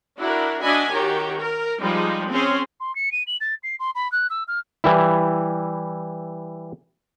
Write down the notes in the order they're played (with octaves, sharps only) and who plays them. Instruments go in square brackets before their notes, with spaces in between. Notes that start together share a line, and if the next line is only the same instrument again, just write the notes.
[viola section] D4 E4 F#4 A#4
D4 F#4 D#5 E5 G#5 B5
D#3 F#4 G4 C#5 A#5
A#4
F3 G3 G#3 D#4
C4 C#4 G#4 C5
[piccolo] C6
C#7
D#7
F#7
A6
C7
C6
B5
F#6
E6
F6
[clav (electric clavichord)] E3 G3 E4